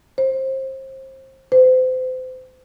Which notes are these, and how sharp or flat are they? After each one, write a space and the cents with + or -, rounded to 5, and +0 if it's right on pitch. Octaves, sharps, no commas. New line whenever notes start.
C5 +30
C5 -35